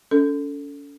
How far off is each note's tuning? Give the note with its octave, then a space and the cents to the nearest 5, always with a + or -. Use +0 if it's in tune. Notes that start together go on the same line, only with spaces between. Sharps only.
C#4 +40 A4 +10